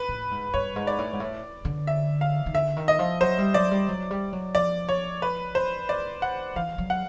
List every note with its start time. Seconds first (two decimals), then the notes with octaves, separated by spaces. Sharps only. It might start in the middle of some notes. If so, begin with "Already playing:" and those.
Already playing: B4
0.09 A2
0.31 G#2
0.54 G2 C#5
0.76 G#2
0.87 D5
0.98 A2
1.13 G#2
1.20 A2
1.65 D3
1.87 E5
2.21 F5
2.46 D#3
2.54 D3 E5
2.77 D#3
2.88 D#5
2.99 F3
3.21 F#3 C5
3.38 G3
3.54 F#3 D5
3.71 G3
3.88 F#3
4.11 G3
4.33 F#3
4.55 F3 D5
4.89 C#5
5.22 B4
5.55 C5
5.89 D5
6.22 F#5
6.56 E3 F5
6.78 F#3
6.90 F#5